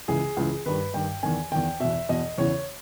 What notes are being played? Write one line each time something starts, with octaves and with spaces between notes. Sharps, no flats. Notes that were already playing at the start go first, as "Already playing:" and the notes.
C#2 C#3 E3 G#4
C#2 C#3 E3
G2 D#3 B4
G2 D#3 G5
E2 D#3 G#5
E2 D#3 G5
E2 B2 E5
E2 B2 D#5
E2 C#3 E3 C#5